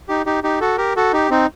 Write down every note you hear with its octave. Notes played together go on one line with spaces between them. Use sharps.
D#4 G4
D#4 G4
D#4 G4
F#4 A4
G4 A#4
F#4 A4
D#4 G4
C4 D#4